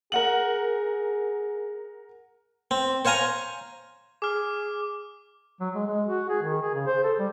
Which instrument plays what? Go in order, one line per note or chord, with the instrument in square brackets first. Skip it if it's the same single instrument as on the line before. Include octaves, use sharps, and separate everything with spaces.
[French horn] G#4 [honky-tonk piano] A#4 F#5 F#7
[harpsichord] C4
C5 C#5 F5 G#5 A#5
[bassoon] G#4 [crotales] D6 F6
[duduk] F#3
G#3
G#3
F#4
G#4
D#3
G#4
C#3
C5
A4
G3